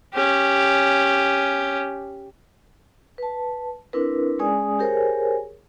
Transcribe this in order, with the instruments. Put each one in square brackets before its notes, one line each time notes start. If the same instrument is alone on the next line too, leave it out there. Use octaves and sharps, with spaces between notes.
[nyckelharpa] C#4 G4
[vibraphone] B4 A5
C4 D4 E4 A#4 B4
G#3 C#4 G#4 D5 G#5 D#6
G4 G#4 A#4 C5 C#5 G#5